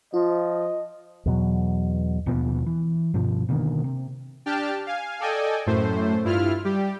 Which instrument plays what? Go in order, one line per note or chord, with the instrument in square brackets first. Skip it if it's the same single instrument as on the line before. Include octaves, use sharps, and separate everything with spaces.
[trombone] F3 [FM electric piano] F4 [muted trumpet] D#5
[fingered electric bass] E2 B2 F#3
[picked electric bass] D#2 B2 F3 B3
E3
G2 B2 F3
B2 D3 D#3 A#3
C3
[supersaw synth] D4 G4 G5 A5 F6
F5 G#5
A4 D5 D#5 G5 G#5
F#2 A2 A3 C5
G2 E4 F4 F6
G3 G4